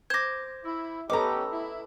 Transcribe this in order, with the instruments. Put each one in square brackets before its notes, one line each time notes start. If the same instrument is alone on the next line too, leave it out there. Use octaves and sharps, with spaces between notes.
[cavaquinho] C5 D6 [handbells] G#6 A#6
[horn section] E4
[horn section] B3 C#4 G4 [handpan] A4 B4 D#5 [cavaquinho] A#5 D6
[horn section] E4